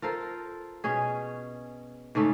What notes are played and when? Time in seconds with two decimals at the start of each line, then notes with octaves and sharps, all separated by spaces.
0.02 F4 A4 A#4 C5
0.84 B2 C#4 G#4
2.15 G#2 C#3 A3 C#4